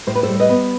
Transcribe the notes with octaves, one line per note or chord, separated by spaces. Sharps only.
A2 C5
B4
A4 C5
G3
B4 D#5
B3